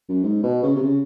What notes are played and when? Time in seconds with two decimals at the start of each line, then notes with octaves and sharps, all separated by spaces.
0.09 F#2
0.23 G#2
0.43 B2
0.63 C#3
0.76 C3
0.83 C#3